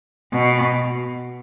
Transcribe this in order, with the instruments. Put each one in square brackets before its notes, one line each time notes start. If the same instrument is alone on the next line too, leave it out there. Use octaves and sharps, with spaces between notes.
[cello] B2